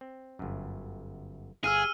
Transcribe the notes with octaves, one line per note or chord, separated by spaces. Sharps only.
C4
G1 F#2
G1 G#4 F5 E6 F6 D#7